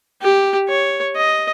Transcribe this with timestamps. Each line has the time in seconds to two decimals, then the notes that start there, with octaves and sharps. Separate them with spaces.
0.22 G4
0.69 C#5
1.16 D#5